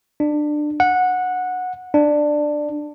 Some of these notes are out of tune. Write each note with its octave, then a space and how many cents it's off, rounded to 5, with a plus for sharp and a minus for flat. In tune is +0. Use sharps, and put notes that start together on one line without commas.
D4 +20
F#5 -15
D4 +10